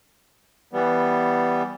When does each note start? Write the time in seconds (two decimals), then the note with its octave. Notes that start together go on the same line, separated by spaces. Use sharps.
0.73 E3 G3 B3